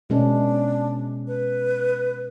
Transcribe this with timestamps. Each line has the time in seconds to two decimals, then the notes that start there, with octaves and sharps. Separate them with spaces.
0.10 B2 G#3 C#4 D4
1.27 B4